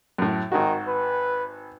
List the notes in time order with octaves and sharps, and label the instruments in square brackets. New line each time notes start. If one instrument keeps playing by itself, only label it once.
[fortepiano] F#2 A2
[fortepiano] G#1 F#4 [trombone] D#3
[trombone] B4